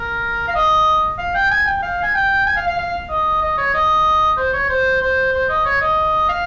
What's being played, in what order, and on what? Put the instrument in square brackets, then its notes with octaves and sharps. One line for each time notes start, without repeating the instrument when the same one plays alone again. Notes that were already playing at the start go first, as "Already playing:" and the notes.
Already playing: [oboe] A#4
F5
D#5
F5
G5
G#5
G5
F5
G#5
G5
G#5
F5
F5
F5
D#5
D#5
C#5
D#5
C5
C#5
C5
C5
C5
D#5
C#5
D#5
F5